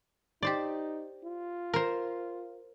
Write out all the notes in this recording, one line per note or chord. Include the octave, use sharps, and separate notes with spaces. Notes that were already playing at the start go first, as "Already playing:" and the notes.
D#4 G4 C5 D5
F4
A#4 C5